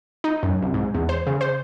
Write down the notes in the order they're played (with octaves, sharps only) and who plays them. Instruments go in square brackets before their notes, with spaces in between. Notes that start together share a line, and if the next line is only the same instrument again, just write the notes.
[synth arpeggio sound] D#4
F#2
C2
G#2
E2
C5
C#3
C5